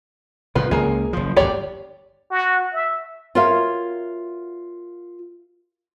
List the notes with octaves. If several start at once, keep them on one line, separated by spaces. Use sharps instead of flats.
C2 A2 F3 F4 B4
C#2 A#3 G#4
F#1 F3
G1 D2 G4 C#5 D5
F#4
E5
F4 F#4 A#4 C#5 E5 F5